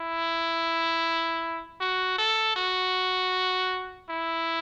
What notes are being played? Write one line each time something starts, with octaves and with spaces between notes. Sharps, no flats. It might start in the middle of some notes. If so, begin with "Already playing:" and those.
Already playing: E4
F#4
A4
F#4
E4